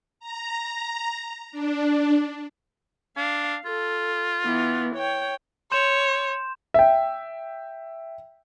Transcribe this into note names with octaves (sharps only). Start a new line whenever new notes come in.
A#5
D4
D4 F5
F4 A4
E3 B3
C#5 G5
C#5 C6 G6 E7
E5 G5